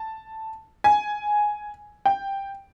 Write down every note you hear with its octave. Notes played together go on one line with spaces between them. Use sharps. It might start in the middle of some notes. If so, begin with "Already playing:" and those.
Already playing: A5
G#5
G5